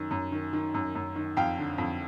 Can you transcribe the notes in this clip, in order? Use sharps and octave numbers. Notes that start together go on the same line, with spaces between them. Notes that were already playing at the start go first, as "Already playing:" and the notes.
Already playing: F#2 D#3
F#2
D#3
D#3
F#2
F#2
D#3
F2 F5 G5
D3
F2